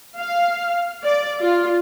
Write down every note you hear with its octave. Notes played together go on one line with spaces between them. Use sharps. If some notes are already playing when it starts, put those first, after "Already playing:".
F5
D5
F4